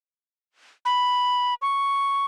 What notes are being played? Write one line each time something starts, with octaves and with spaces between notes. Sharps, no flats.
B5
C#6